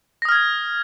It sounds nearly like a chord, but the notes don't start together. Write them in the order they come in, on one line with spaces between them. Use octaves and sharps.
A#6 D#6 F6 G#6